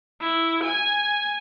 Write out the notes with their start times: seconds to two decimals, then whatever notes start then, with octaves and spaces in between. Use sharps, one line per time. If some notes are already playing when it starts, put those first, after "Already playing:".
0.20 E4
0.63 G#5